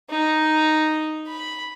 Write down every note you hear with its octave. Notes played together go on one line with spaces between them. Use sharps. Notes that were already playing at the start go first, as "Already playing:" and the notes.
D#4
B5